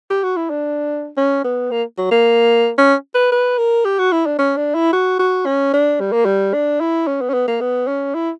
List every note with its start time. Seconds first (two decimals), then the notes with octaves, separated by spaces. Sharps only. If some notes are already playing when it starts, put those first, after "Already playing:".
0.10 G4
0.23 F#4
0.37 E4
0.50 D4
1.17 C#4
1.44 B3
1.71 A#3
1.98 F#3
2.11 A#3
2.78 C#4
3.14 B4
3.32 B4
3.58 A#4
3.85 G4
3.99 F#4
4.12 E4
4.26 D4
4.38 C#4
4.57 D4
4.75 E4
4.93 F#4
5.19 F#4
5.46 C#4
5.73 D4
6.00 G3
6.12 A#3
6.25 G3
6.53 D4
6.81 E4
7.07 C#4
7.21 B3
7.29 C#4
7.34 B3
7.48 A#3
7.61 B3
7.87 C#4
8.14 E4